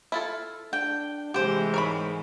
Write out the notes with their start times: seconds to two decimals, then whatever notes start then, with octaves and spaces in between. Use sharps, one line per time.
0.12 E4 F4 A4
0.73 D4 G5
1.34 C3 E3 G#3 A3 G4 C5
1.74 G#2 A#4 C#5 B5